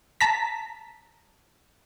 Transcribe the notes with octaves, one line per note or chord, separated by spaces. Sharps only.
A5 A#5 B6